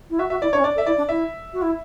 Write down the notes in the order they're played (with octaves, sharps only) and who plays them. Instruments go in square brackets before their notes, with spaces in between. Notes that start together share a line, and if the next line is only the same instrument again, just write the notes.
[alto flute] E4
[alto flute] F#4 [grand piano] E5
[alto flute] F#4 [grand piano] E5
[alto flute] E4 [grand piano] D5
[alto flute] D4 [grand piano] C#5
[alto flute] C#4
[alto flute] D4 [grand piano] D5
[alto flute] A4
[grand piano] E5
[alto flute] E4 [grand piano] D5
[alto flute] D4
[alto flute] E4 [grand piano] E5
[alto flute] F#4
E4